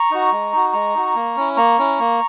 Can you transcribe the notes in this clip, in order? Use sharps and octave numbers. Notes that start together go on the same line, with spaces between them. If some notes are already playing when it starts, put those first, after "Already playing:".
Already playing: A#5 C#6
D#4 F#4
G#3
D#4 F#4
G#3 A#5 C#6
D#4 F#4
A#3
C#4 E4
A#3 A#5 C#6
C#4 E4
A#3